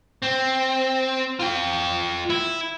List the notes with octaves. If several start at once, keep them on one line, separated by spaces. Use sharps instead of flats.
C4
F4 G5
E4